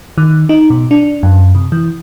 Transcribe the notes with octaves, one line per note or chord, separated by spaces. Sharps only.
D#3
D#4
B2
D4
F#2
C3
E3